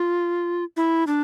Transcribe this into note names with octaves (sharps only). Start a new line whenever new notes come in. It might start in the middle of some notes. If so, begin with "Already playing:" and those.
Already playing: F4
E4
D4